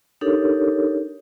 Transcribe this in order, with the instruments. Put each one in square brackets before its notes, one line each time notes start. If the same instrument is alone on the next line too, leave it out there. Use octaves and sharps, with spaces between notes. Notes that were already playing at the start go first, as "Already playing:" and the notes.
[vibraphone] D4 D#4 G4 A4 A#4 C#5